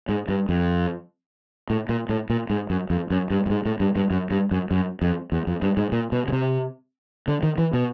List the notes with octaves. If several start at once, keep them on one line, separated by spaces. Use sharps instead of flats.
G#2
G2
F2
A2
A#2
A2
A#2
G#2
F#2
F2
F#2
G2
G2
G#2
A2
G2
G2
F#2
G2
F#2
F#2
F2
E2
F2
G2
G#2
A#2
B2
C#3
C3
D3
D#3
E3
B2